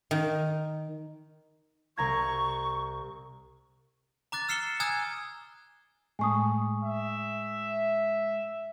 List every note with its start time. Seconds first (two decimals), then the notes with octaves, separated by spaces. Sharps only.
0.11 D#3
1.97 C2 A#5 C#6 G#6
4.32 A#5 D6 F#6 A6
4.49 E6 F6 C7 C#7 E7 G7
4.80 G#5 A#5 D#6 E6 F#6 G#6
6.19 A2 G#3 A3 G#5 C#6 D#6
6.83 E5